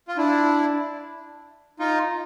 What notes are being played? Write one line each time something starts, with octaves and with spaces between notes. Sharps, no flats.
F4
D4 E4
D#4 F4